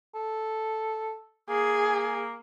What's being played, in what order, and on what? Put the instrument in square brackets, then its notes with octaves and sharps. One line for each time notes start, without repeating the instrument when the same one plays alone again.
[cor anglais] A4
[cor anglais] A#3 [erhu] G#4